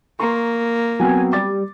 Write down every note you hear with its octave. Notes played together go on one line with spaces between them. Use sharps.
A#3 A#5 C6 C#6
F#3 B3 C4 G#5
G3 D6 A6